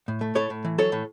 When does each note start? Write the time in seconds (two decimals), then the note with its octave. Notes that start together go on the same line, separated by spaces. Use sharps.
0.08 A2
0.21 A3
0.35 A2 A4 C#5
0.50 A2
0.65 E3
0.78 F#3 A4 C#5
0.92 A2